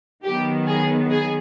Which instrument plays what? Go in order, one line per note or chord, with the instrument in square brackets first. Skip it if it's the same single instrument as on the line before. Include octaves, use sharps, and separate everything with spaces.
[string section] D#3 F#3 B3 G4
G#4
G#4